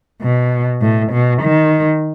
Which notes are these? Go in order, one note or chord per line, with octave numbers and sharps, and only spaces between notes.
B2
A2
B2
D#3